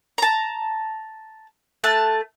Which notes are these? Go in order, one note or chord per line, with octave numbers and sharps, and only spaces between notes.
A5 A#5
A3 A5 F#6